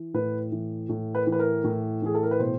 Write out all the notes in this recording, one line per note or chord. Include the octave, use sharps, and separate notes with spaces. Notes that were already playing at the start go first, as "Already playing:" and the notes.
Already playing: E3
A2 B4
E3
A2
B4
E3
B4
A#4
A2
E3 G#4
A4
A#4
B4
B2 C5